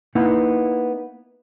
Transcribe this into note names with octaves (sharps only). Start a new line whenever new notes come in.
A#3 B3 D#4 E4 F#5